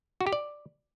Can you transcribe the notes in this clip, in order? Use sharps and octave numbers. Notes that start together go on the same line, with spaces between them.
F#4
G4
D5